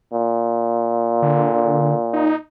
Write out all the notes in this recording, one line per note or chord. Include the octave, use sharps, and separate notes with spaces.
A#2
D3
D#4